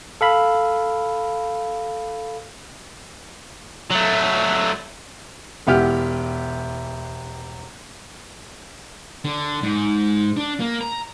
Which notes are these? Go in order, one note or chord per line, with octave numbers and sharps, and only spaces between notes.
A4 F5 B5
F#3 A3
E1 B3 E4 G4 F6
D3
G#2
D4
A#3
A#5